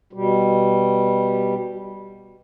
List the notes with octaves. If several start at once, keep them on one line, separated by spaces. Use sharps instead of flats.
B2 G3